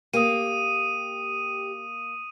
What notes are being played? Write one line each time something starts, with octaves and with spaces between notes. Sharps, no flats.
A#3 G4 D#6 D#7